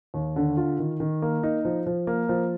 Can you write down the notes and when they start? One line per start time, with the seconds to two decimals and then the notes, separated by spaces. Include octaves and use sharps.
0.14 D#2
0.36 D3
0.57 F4
0.79 D#3
1.00 D#3
1.22 A#3
1.43 D#4
1.65 F3
1.87 F3
2.07 A#3
2.29 F3